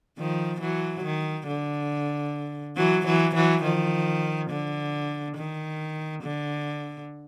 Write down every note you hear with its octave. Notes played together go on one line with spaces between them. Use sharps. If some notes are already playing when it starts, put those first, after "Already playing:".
D#3 F3
E3 F#3
D#3
D3
E3 F#3
E3 F#3
E3 F#3
D#3 F3
D3
D#3
D3